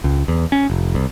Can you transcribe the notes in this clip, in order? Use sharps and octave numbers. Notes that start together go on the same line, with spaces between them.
C#2
E2
C#4
F1
C2